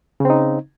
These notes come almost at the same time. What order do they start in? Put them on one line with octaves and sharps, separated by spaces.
C#3 C4 D#4